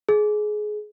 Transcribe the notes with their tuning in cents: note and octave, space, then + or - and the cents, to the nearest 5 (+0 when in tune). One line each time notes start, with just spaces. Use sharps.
G#4 +20